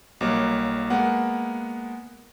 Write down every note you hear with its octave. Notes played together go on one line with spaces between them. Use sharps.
B1 F#3 G3 A#3 C#5
G#3 A#3 B3 F#5